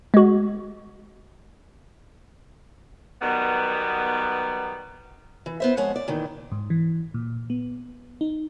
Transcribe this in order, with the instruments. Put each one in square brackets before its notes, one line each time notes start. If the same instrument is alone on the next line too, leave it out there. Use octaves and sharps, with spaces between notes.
[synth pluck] G#3 F#4
[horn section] D#3 F#3 G3 B3
[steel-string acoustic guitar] E3
B3 C5 E5
F2 G#3 C#5 F#5
D5
A#2 D#3 E3
[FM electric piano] G#2
E3
A#2
B3
D#4